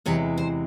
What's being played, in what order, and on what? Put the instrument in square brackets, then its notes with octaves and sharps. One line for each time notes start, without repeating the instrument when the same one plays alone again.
[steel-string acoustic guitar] E2 C3 E3 G#3 C#5
C5